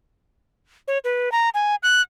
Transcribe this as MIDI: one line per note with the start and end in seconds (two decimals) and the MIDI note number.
0.88 0.98 73
1.04 1.32 71
1.32 1.49 82
1.54 1.75 80
1.83 2.01 90